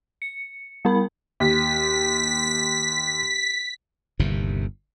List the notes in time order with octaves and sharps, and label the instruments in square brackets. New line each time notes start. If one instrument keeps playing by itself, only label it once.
[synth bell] C#7
G3 B3 A#4 B5
[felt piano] D#2 [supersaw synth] B6
[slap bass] G1 D#2 C3